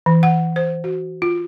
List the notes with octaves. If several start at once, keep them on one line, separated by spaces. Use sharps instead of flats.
E3
F#5
C5
F#4
F4